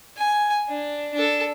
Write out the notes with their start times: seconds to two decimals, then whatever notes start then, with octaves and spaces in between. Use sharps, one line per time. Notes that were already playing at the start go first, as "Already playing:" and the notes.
0.17 G#5
0.69 D4
1.14 D4 A4